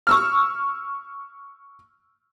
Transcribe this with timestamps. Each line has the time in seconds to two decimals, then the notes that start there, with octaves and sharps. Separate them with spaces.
0.07 C#6 E6 F6